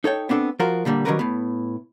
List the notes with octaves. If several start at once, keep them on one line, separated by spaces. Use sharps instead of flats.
D#4 A4 C#5 G5
B3 C4 D4 F#4 A4
F3 F4 F#4 A#4
A#2 D3 G3 A#3
D#3 F#3 G3 C#4 A#4 B4
A2 B3